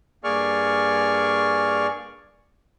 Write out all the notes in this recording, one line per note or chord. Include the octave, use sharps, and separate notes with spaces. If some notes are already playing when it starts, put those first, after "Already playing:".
G2 A#3 G#4 D5 C#6 F6